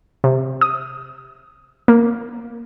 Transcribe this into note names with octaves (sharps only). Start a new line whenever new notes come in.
C3
D#6
A#3